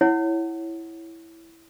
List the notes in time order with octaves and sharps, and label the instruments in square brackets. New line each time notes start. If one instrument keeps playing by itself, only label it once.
[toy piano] E4 C#5 F#5